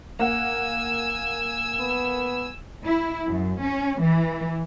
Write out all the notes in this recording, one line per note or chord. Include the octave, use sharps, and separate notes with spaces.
A#3 F#5 G#5 E6
B3
E4
F#2
C#4
E3